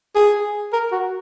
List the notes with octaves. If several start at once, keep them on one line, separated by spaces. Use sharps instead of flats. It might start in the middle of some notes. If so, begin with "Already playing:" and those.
G#4
A#4
F#4